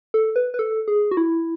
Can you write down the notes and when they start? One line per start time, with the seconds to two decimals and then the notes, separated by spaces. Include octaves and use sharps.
0.14 A4
0.36 B4
0.54 B4
0.59 A4
0.88 G#4
1.11 F#4
1.17 E4